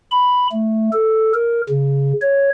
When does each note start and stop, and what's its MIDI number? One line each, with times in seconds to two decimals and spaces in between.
0.11 0.48 83
0.52 0.90 57
0.93 1.33 69
1.34 1.62 70
1.69 2.13 49
2.21 2.50 73